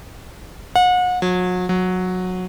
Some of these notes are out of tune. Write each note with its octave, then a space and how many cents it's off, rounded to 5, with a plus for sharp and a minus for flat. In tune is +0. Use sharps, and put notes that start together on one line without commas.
F#5 -35
F#3 -35
F#3 -15